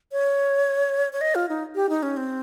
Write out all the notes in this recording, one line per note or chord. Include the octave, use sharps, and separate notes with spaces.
C#5
C#5
D#5
F4
D#4
G4
D#4
C#4
C4